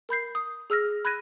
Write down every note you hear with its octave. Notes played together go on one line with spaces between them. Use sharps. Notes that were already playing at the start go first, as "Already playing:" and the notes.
A#4 B5 G6 C7
D#6
G#4 E6 F6 A#6
B5 F#6 G#6 A#6 D#7